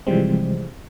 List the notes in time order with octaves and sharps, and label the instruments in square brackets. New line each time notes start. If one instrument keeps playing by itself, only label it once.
[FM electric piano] C3 E3 F3 G3 G#3 C4